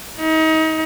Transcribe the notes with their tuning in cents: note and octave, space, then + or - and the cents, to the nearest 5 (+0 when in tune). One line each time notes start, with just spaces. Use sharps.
D#4 +30